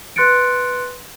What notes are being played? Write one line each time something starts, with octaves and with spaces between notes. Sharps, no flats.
B4 C6 F#6 A6 C#7 D7